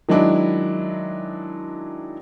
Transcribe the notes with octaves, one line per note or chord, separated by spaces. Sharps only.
D#3 F#3 G#3 D4 E4